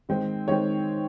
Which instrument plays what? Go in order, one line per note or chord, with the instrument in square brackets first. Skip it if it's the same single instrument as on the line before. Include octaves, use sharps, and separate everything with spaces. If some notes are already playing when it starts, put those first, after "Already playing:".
[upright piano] D#3 G#3 C4
D#3 G#3 C4 C#5